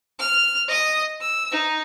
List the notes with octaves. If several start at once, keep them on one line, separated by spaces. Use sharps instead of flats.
F6
D#5 D#6
E6
D#4